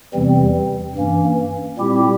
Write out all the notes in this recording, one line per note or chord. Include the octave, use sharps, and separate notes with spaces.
E2 C3 E3 G3 C4
G2 E3 A#3 C#4
A#2 G3 C4 E4 G4